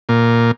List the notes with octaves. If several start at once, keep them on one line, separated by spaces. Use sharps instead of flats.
A#2